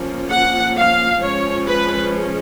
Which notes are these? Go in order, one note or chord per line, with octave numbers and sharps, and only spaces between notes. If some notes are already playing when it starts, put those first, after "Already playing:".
Already playing: F3 A#3 C#4
F#5
F5
F3 G#3 C#4 C#5
B4